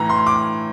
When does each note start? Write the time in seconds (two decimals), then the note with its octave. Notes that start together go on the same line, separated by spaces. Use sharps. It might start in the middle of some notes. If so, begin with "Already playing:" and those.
Already playing: A2 E3 A#5
0.10 C6
0.26 D6